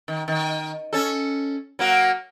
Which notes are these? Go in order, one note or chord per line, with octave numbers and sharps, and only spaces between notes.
D#3
D#3
C#4 A4
F#3 A#3 F#4